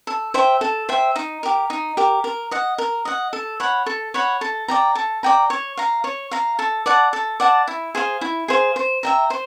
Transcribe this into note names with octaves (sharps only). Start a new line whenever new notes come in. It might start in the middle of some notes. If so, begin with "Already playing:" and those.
A4
C5 E5 G5
A4
C5 E5 G5
D#4
G4 A#4
D#4
G4 A#4
A#4
D#5 F#5
A#4
D#5 F#5
A4
C#5 F#5 B5
A4
C#5 F#5 B5
A4
D5 G5 A#5
A4
D5 G5 A#5
C#5
F5 A#5
C#5
F5 A#5
A4
D5 F#5 A5
A4
D5 F#5 A5
E4
G#4 C5 F5
E4
G#4 C5 F5
C5
E5 G5 A#5
C5